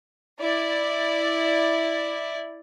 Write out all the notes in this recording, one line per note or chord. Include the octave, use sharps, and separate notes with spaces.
E4 D5